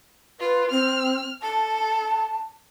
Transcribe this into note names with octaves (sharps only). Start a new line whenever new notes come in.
F4 B4
C4 F6
A4 A5